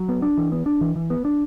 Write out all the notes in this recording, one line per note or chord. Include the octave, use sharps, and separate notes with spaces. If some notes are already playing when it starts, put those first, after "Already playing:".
Already playing: F#3
B3
D4
E3
B3
D4
E3
E3
B3
D4